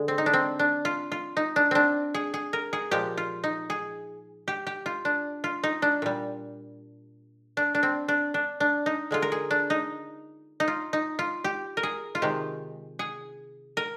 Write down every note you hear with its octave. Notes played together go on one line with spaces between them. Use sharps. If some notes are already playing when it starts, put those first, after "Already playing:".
Already playing: D3 G#3
C4
D#4
D4
C4
D4
F4
F4
D#4
D4
C4 D4
G#4
G#4
A#4
G#4
A#2 F3 G#3 G4
F4
D#4
G#4
G4
G4
F4
D4
F4
D#4
D4
A#2 G3
D4
D4
C4
D4
D4
D4
D#4
D3 G#3 F4
A#4
G#4
D4
D#4
D#4
F4
D#4
F4
G4
A#4
G#4
F4
C3 D#3 G#3 G4
G#4
A#4